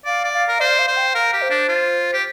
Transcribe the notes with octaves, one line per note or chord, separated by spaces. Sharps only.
D5 F5
D5
F5
A#4
C5 D5
F5
C5
G5
A#4 F5
G4
C5
D4
F4
G4